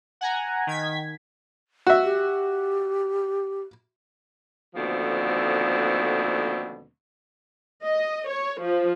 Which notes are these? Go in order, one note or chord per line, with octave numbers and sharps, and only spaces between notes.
F#5 G#5 A#5
D#3 G#6 B6
F#4 E5
G4
D#2 B2 D3 F3 A3 C4
D#5
C#5
F3